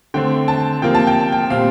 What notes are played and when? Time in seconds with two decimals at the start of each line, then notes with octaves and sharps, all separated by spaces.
0.14 D3 A3 C4 G5
0.48 A5
0.82 C3 F3 A#3 G5
0.95 A5
1.07 G5
1.20 A5
1.32 G5
1.50 A#2 G3 C4 F5